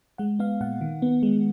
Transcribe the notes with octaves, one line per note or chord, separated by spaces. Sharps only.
G#3 F#5
B3 F5
A#2 F#5
D#3
B3
G#3